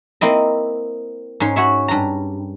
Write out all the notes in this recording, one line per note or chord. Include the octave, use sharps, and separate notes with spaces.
A#3 C4 E4 D#5
G#2 C#4 C#5 C6
F#4 C#5 E5
G2 A#5